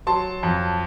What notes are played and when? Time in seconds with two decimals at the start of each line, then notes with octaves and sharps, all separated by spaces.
0.07 F#3 A5 C6
0.43 F2